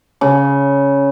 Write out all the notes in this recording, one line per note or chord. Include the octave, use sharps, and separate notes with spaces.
C#3